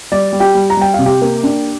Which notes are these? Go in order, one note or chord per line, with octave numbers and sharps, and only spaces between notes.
G3 D5
G3
G4 G5
G3
A#5
G3 G5
C3 F5
G4 G5
A#3
D4